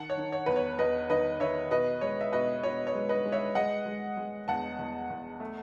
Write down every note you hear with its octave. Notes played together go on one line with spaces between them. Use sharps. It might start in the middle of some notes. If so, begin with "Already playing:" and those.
Already playing: D#3 F#5 A5
C#5
D#3
C#5
E2 B4
C#5
E2 B4 D#5
D#3 B4 D#5
D#3 C#5 E5
B2 B4 D#5
G#3 C#5
E5
B2 B4 D#5
B2 C#5
C#5
G#3
B4 D#5
G#3
C#5 E5
G#3 D#5 F#5
G#3
G#3
E2 F#5 A5
E2
E2
A3